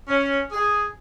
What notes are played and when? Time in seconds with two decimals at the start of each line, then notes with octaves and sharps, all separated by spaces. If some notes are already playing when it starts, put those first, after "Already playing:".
0.08 C#4
0.52 G#4